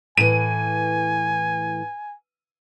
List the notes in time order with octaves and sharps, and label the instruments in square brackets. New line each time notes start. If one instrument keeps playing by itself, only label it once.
[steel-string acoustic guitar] A2 E3 [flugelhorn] G#5 [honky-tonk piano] D#7